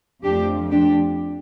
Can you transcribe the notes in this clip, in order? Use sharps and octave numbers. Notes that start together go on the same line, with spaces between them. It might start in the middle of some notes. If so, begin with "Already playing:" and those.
F2 F3 A3 D4 G4
D4 G4